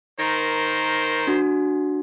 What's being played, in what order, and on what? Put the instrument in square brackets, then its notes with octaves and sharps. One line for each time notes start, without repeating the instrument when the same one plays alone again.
[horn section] D#3 A#4 C5
[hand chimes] D4 F#4